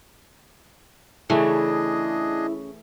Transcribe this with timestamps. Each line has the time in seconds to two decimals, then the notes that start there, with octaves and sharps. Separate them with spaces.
1.30 C#3 E3 A3 D4 E4 G#4 D#5